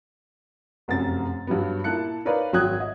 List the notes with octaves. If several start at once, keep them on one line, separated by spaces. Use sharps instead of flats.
F1 F#2 C4 A6
G2 F#3 G3 B3
A#2 A#3 E4 A5 F#6 C#7
D#4 A#4 B4 C#5 D5 F5
G#1 F#3 G5 D#6 F#6 G#6
D#5 E5